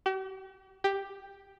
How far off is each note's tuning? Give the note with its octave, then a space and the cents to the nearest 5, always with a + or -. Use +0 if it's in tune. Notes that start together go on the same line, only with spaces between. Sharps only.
G4 -45
G4 +5